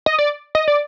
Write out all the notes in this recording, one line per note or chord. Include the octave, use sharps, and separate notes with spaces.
D#5
D5
D#5
D5